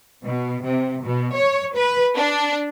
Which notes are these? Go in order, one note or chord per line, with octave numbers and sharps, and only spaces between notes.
B2
C3
B2
C#5
B4
D4